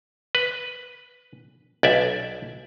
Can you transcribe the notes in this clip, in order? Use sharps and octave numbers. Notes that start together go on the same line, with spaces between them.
B4
B1 D5 E5